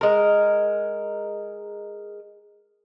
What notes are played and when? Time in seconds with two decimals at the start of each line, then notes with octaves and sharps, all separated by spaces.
0.01 G#3 A#4